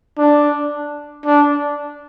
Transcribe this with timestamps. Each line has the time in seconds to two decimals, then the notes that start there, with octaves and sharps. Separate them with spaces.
0.18 D4
1.25 D4